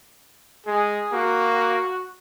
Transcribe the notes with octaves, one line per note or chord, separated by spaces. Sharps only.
G#3 G#4
A#3 F#4